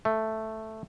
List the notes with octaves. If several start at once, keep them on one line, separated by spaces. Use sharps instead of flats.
A3